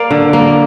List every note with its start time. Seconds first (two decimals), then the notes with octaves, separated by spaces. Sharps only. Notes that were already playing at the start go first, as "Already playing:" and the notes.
Already playing: A#3 D5 F5
0.11 D3
0.33 A#3